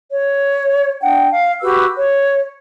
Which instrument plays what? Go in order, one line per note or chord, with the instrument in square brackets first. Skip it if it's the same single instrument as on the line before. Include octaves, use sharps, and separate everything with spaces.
[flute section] C#5
D4 F#5 G5
F5
F#4 G4 B4 E6
C#5